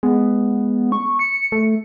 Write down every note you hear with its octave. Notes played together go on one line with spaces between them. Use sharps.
G#3 B3
C#6
C#7
A3